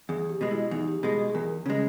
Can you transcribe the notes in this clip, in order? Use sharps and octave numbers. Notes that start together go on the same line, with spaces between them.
E2 G#4
G4
B2 G#3
E4
E2 D#4
G4
B2 G#3 G#4
G#4
G#4
E2 A#4
C#3 G#3